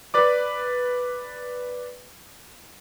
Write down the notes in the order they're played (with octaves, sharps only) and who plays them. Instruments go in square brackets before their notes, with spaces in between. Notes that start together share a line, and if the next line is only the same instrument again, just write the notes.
[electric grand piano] B4 D5 D6